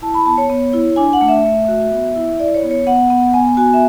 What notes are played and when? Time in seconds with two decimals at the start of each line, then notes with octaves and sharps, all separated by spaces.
0.02 E4 A5
0.14 B5
0.26 B3 A5
0.38 C#5
0.50 B3
0.73 E4
0.96 D4 G#5
1.13 F#5
1.21 A3
1.28 E5
1.45 A3
1.68 F#4
1.91 B3
2.16 E4
2.40 E4 D5
2.54 C#5
2.63 B3
2.71 C#5
2.87 B3 F#5
3.10 B3
3.33 B3 G#5
3.57 F#4 G#5
3.74 E5